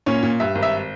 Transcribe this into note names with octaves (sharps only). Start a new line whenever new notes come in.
A#2 C#4 C#5
A#2
G2 E5
G#1
E5